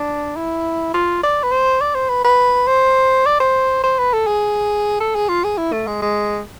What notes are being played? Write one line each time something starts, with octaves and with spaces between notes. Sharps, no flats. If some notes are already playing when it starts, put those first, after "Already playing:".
Already playing: D4
E4
F4
D5
B4
C5
D5
C5
B4
B4
C5
D5
C5
C5
B4
A4
G#4
A4
G#4
F4
G#4
E4
A3
G#3
G#3